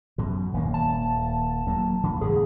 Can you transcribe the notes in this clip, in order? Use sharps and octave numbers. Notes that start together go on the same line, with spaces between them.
F#2 B2
D#1 D#2 A#3
A5
F#3 A#3
C#3
G#2 E3 A#3 G#4